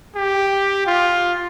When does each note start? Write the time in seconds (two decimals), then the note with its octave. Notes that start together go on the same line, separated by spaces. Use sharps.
0.15 G4
0.87 F4